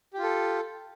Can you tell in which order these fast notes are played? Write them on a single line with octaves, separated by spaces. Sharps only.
G4 F4 A4